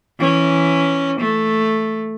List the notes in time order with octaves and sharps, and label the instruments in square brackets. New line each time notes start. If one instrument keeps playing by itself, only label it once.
[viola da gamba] E3 C#4
A3